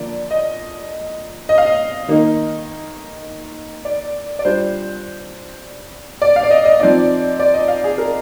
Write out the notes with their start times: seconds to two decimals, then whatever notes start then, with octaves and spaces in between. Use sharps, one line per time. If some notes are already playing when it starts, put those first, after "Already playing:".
Already playing: D3 F3 A#3 D5
0.31 D#5
1.49 D#5
1.58 F5
1.66 D#5
2.08 D#3 A#3 D#4
3.85 D5
4.39 D5
4.45 G3 D4 F4 C5
6.22 D5
6.36 F5
6.44 D5
6.51 D#5
6.65 D#5
6.80 F3 C4 D#4 D5
7.40 D5
7.54 D#5
7.68 F5
7.84 G#4
7.98 A#4